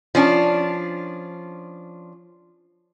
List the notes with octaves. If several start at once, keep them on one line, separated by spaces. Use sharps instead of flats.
F3 C#4 D4